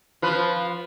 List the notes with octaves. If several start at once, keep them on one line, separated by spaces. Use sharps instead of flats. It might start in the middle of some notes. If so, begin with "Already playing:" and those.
F3 F4 B4